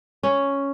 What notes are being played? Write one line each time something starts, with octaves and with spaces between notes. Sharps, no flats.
C#4